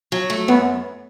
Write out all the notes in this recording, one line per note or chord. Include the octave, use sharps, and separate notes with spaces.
F#3
A3
F#2 B3